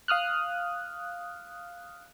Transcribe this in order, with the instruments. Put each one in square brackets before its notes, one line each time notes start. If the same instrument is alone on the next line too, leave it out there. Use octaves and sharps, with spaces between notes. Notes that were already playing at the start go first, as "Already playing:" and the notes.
[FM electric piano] F5 D#6 F6 F#6